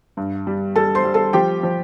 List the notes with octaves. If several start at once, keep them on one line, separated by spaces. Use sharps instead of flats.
G2
G3
G3 A4 A5
C5 C6
G3
A4 A5
F3 G4 G5
F3